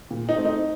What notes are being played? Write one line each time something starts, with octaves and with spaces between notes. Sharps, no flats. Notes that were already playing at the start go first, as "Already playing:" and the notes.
A#2
D#4
A3 C4
D#4